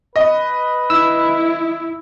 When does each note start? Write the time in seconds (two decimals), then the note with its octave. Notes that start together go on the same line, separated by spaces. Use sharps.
0.16 B4 D#5
0.90 E4 E6